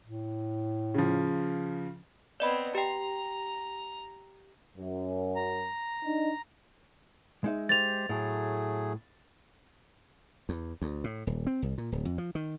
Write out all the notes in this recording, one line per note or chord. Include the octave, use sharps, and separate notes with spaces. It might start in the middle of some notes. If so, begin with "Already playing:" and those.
A2
C#3 F3
B3 C4 D5 D#5 B5
G4 G5 A#5
F#2
A#5
D4 D#4
G#3 D#4 E5
G4 C5 A6 F7
A2 F#3 A3 G#4
E2
D2
A2
D#1
C4
C2
A#2
D1
F2
F3
D#3